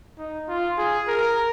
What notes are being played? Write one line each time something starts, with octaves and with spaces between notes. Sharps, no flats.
D#4
F4
G#4
A#4